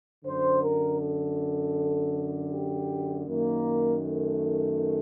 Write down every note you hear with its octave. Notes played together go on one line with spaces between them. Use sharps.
F#2 D3 C5
A#4
A4
G4
F#2 D#3 A#3
A3